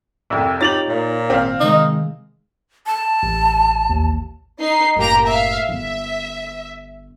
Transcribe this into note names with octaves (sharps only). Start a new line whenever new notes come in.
C2 F2 E5 E6
D#4 F4 G4 C#5 A6 F7 F#7
A#2
G#1 C4 F5
C3 D#3 G#3 D#4
A5
A1
D#2
D#4 C7
F#1 A2 A#3 G4 A#5
E5 F5
G1 E5